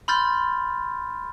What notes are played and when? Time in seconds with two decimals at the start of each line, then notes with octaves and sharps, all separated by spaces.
0.08 B5 C6 F6 G6 A6